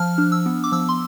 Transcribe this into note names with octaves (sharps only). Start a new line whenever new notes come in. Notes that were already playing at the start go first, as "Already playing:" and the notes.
Already playing: F3 F6
D4
E6
B3
D6
F3 E6
C6